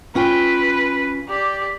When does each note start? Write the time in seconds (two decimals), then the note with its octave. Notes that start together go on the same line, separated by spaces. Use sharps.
0.15 C#4 F4 B4 G5
1.28 G4 D5